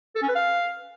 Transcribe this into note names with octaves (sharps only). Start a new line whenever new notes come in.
A4
C#4
B4
F5